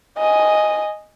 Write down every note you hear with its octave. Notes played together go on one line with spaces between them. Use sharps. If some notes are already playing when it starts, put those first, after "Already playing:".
D#5 G#5